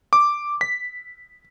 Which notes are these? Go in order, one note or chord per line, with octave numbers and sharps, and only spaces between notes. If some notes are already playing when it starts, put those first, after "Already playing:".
D6
B6